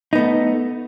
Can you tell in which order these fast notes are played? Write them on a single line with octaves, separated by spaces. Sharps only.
D#4 B3 A3